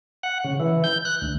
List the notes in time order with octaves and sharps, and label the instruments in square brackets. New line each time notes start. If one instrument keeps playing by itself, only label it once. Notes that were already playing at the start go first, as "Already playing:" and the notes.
[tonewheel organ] F#5
C#3
E3
G6
F#6
D2